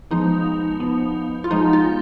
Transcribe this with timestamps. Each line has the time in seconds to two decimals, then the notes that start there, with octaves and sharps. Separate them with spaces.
0.11 F3 G#3 B3 D#4
0.80 F3 B3
1.44 F4
1.50 F3 G#3 B3 D#4
1.73 F4